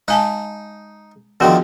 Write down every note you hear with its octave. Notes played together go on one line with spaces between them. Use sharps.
G#3 D#4 G#5 A5
D3 D#3 F3 B3 F#4 G#4